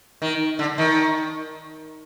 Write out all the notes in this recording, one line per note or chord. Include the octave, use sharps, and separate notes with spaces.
D#3
D3
D#3